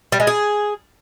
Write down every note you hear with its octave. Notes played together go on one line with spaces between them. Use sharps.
G3
G#3
G#4